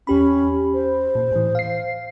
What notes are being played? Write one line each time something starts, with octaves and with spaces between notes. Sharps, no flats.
E2 C#4 G4 B5
C5
A#2
A2 E3
F5 C7